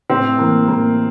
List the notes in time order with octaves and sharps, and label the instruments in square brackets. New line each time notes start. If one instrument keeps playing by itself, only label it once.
[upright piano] A2 C4
E3 A#3
A2 A#3